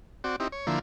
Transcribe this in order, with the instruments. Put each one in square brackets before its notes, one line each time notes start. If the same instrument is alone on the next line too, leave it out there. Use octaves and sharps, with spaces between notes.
[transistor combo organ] C4 F#4 D5
C4 D#4 E4 G4
C#5
D3 F3 A#3 E4